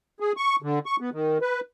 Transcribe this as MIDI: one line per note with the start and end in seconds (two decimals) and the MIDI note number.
0.20 0.32 68
0.37 0.56 85
0.62 0.79 50
0.86 0.96 85
1.00 1.10 59
1.12 1.38 51
1.41 1.60 71